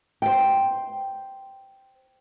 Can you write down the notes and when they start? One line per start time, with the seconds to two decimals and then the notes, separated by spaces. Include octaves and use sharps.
0.22 C5 G5